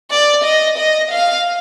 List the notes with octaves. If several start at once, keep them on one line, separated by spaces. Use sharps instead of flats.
D5
D#5
D#5
F5